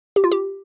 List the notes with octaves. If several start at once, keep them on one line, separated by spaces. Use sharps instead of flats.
G4
F4
G4